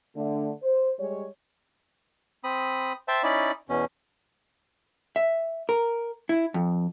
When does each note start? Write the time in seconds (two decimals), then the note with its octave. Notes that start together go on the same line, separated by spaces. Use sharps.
0.16 D3 A3
0.62 C5
0.99 G3 G#3 C#5
2.44 C4 B5 D#6
3.08 C5 E5 G5 A5
3.23 C#4 D#4 E4 D5 B5
3.69 E2 B2 C#4
5.16 E5
5.69 A#4
6.29 E4
6.54 F2